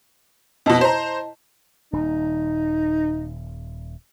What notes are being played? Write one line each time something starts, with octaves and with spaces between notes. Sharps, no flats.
F2 B2 E4 D#5 A5
C5 A#5
D#1 D#4